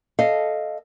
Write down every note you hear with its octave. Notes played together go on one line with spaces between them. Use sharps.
A4 D#5 F5